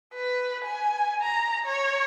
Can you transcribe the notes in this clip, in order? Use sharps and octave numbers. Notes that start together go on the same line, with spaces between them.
B4
G#5
A#5
C#5